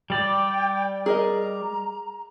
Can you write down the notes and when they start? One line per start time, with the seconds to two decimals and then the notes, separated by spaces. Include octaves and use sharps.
0.10 G3 D5 G5
1.06 G#4 A#4 D#5 A#5